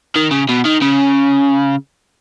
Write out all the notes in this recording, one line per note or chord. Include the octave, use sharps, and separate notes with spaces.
D#3
C#3
B2
D#3
C#3